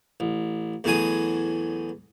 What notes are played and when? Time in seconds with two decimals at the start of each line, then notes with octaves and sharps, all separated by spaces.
0.20 A1
0.84 E2 A2 F#3 G#4 D#6